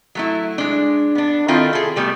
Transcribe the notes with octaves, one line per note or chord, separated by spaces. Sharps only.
F#3 A3 E4
G#3 D4
B3 D4
D#3 C4 E4 F4 A4
G#4 A4
G3 A3 B3